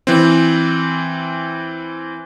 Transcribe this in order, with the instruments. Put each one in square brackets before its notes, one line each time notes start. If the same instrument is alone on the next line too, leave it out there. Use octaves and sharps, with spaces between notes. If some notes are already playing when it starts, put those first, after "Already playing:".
[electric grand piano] E3 C4